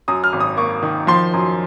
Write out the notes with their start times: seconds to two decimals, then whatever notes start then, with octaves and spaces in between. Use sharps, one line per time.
0.08 F#2 D#6
0.24 F6
0.33 G#1
0.40 D#6
0.57 A#3 C#6
0.83 D#3
1.07 F3 C6
1.34 F#2